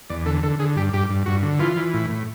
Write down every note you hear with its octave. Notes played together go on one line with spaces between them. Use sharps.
E2 D5
D3 A4
D3 A4
D3 G#4
G2 G4
G2 G4
G2
G2 F#4
D3
E3 F4
E3
A2
A2